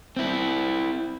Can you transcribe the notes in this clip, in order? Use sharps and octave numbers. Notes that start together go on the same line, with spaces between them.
C4 E4